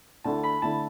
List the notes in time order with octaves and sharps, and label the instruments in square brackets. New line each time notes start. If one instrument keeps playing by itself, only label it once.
[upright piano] D2 D3 A3 E4 [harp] A5
[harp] B5
[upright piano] D3 A3 E4 [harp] A5